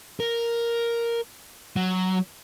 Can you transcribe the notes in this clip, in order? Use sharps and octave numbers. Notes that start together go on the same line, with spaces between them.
A#4
F#3